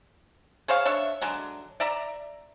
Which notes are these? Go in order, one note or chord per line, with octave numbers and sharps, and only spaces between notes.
G#4 C5 C#5 F5
D4 C#5 E5
D3 F#3 G#3
D5 E5 A#5